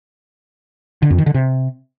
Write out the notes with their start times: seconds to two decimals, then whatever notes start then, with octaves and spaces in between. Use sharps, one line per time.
1.02 D3
1.10 F2
1.18 D#3
1.26 D3
1.34 C3